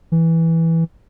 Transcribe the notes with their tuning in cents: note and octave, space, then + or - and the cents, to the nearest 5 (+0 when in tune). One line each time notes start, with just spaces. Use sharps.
E3 -5